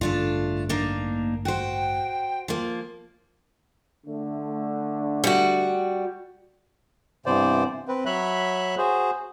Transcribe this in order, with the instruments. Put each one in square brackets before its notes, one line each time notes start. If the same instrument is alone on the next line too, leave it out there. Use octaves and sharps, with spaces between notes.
[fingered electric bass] A1 G2 D3 [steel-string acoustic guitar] A3 D4 F4
[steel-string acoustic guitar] A#3 D4 D#4
[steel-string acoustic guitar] F#4 C5 [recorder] G5
[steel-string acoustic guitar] F3 A#3
[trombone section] D3 A3
[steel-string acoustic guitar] G3 F#4
[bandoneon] G2 C3 E3 B3 C5 D5
C4 B4
F#3 C#5 E5 B5 F#6
F#4 G#4 C5